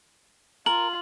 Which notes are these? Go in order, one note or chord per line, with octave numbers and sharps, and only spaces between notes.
F4 A#4 F#7